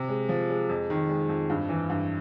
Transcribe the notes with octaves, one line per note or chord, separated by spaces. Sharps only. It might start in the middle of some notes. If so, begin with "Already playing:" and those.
Already playing: C3
G#3
F3
G#3
F2
D#3
G#3
F2
G2
E3
G2